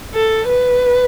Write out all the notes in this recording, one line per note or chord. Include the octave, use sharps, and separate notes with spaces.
A4
B4